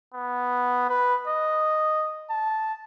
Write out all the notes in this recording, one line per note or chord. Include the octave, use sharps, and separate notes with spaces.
B3
B4
D#5
A5